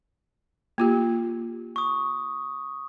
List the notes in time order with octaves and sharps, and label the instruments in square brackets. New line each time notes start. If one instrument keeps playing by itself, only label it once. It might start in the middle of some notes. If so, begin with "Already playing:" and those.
[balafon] A#3 F4 G4
[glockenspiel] C#6 D#6